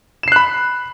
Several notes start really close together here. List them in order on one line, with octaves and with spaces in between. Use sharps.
E7 C7 F#6 B5